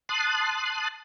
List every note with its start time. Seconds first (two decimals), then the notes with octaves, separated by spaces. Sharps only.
0.09 A5 C6 D#6 F#6